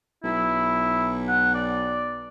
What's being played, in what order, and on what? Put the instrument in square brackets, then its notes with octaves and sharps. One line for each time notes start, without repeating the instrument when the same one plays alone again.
[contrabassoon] B1 [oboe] E4
[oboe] F#5
D5